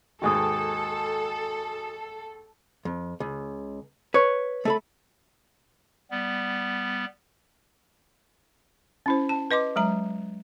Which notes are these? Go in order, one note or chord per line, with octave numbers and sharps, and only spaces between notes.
D#2 G#2 D#3 F#4 A4 G#5 D#6
F2
C#2
B4 C#5
A3 A4 B5
G3 B3
C#4 E4 C5
A5
B4 D#5 C6 D6
F#3 G#3 A#5